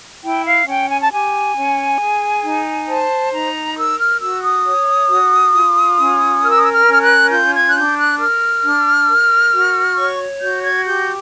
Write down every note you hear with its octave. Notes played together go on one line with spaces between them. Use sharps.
E4 G5
F5
C#4 G5
G#5
A5
G4 G#5
C#4
G#4
D#4
C5 A5
D#4 A#5
A#4 E6
F6
F#4 E6
D#6
C#5
F#4
F4
C#4
A#4 F6
E6
D#6
E6
F6
C#4
F6
F#6
F4 G6
G#6
F#6
D4 G6
F#6
A#4 F6
D4
A#4
F#4
C#5 C#6
F#4 G6
G#6
G4 G6